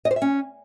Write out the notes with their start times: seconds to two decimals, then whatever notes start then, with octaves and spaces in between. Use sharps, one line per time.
0.05 D#5
0.11 C5
0.16 E5
0.22 C#4